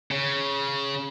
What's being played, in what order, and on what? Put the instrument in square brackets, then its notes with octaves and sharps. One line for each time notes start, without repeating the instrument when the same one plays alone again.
[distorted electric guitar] C#3